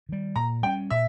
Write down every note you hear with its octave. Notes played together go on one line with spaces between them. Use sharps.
D#3 G3
A#2 A#5
G3 C#4 G5
A#2 E5